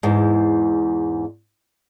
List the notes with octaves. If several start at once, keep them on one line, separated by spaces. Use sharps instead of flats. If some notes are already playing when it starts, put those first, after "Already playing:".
E2 G#2